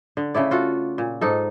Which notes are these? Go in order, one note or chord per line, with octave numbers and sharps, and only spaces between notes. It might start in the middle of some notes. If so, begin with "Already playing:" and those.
D3
C#3 A3 E4 D5
F4 F#4 A4
A#2
G#2 D#4 A4